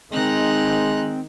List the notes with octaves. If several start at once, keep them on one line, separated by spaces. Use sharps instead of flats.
D#3 G#3 C4 D#4 F#6